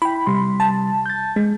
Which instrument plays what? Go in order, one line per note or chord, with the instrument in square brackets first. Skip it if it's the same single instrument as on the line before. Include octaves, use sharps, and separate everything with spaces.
[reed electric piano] E4 G5 [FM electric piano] B5
[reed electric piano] C3 G3 C6
[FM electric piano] A5
[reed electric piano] G6 A6
[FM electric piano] G#3